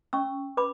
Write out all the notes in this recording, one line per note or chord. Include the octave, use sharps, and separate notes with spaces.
C#4 C#6 E6
B4 B5 D6